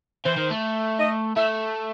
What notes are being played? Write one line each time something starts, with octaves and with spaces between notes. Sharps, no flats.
E3 C5
D#3
A3
D#5
A3 E5